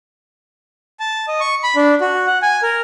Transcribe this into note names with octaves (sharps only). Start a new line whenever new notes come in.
A5
D#5
C#6
B5
D4
F#4
F#5
G#5
A#4